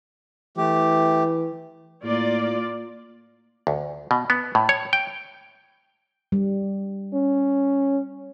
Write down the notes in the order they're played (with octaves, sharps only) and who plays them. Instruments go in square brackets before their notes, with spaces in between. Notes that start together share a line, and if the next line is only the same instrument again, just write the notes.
[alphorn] E3 [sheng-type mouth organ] A3 G4
[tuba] A2 [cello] A#3 [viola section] F4 D5
[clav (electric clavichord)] D2
B2
B3
A2
C#5
G5
[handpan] G3
[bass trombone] C#4